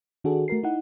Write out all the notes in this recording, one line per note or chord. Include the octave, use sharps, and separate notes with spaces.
D#3 D4 F#4 G#4 A4
A3 F#4 A#4 C7
D#4 E4 F#5